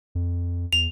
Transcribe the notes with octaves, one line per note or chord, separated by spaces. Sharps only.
F2
E2 F7